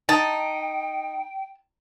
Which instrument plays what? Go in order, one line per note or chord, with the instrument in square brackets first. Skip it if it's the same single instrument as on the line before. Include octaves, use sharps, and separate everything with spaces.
[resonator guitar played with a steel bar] D#4 [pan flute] G5 [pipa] A5